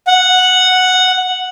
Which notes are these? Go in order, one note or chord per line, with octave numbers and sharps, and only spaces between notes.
F#5